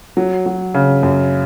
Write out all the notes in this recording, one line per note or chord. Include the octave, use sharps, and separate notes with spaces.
F#3
F#3
C#3
F#2